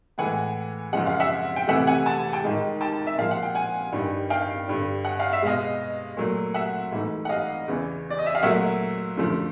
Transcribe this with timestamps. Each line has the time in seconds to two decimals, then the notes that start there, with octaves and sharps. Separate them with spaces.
0.18 A2 E3 G#3 F#5 G#5
0.93 F#2 C#3 F3 G#3 F#5
1.07 F5
1.20 E5 F#5
1.56 G5
1.67 C3 E3 A3 E5 F#5
1.87 F#5 G#5
2.06 A5
2.33 G5 A5
2.43 G#2 D#3 G#3
2.81 G5 A5
3.07 E5
3.17 A#2 F3 G#3 F5
3.31 F#5
3.43 G5
3.55 F#5 G#5
3.92 G2 D#3 G3
4.30 F5 G5
4.68 G2 D3 G3
5.05 F#5
5.20 F5
5.33 E5
5.42 B2 G#3 D#5 F5
6.17 A#2 F#3 A3
6.54 E5 F#5
6.92 G#2 E3 A3
7.25 F#5
7.29 D#5 F5
7.67 E2 C#3 E3
8.10 D5
8.18 D#5
8.26 E5
8.35 F5
8.42 A#2 F#3 A3 E5 F#5
9.17 F#2 D3 F3 A3